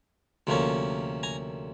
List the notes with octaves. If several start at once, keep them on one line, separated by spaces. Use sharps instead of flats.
D2 C3 F3 A#3 C#4
G#5 A#5